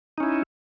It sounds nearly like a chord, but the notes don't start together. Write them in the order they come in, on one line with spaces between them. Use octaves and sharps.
D#4 C#4 E4